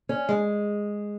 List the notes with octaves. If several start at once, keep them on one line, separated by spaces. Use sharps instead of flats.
C#4
G#3